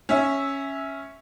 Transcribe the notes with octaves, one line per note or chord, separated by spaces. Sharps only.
C#4 E5